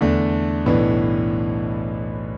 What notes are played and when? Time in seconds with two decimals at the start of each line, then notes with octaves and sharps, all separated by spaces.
0.01 E2 D3 A3 D4
0.66 B1 A2 E3 B3 D4